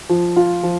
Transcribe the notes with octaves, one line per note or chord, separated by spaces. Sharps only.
F3
F4
F3